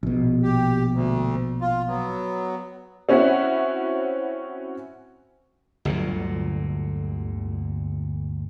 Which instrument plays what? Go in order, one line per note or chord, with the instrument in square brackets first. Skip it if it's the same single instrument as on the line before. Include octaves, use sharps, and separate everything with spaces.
[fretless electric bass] A#1 B2
[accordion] G4
D2
F4
F#3 B3
[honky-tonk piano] C4 C#4 E4 F#4 E5 F#5
[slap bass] G1 D2 A#2 F#3